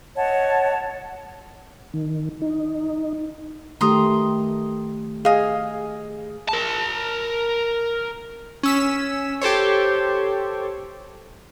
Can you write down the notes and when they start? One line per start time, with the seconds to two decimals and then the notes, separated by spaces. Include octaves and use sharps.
0.15 C#5 D#5 F#5 A5
1.93 D#3
2.42 D#4
3.81 D#3 A3 G4 A#5 C6 D#6
5.25 G#4 D#5 F5
6.49 A#4 A5
8.63 C#4 E6 B6
9.42 G4 A4 C5 C#5